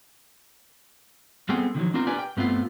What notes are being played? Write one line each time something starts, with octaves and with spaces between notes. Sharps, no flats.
G3 B3 C4 G#4 A4 G5
D3 D#3 F3 F#3
B3 C4 D4 F4 A#4 C5
G4 A#4 B4 D5 G5 G#5
G5
G2 A3 B3 C4 F4